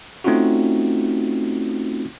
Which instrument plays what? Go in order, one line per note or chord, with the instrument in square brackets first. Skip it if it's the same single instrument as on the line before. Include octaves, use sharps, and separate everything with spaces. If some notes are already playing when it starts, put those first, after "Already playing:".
[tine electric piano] A3 C4 C#4 D#4 F4 F#4